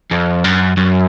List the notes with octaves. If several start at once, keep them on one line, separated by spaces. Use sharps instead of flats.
F2
F#2
F#2